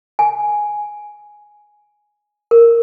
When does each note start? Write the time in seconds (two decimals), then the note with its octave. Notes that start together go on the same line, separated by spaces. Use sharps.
0.19 G#5
2.51 A#4